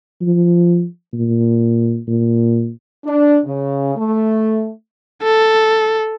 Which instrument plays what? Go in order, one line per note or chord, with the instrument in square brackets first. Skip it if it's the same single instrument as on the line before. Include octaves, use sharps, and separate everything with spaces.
[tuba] F3
A#2
A#2
[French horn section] D4
C#3
A3
[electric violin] A4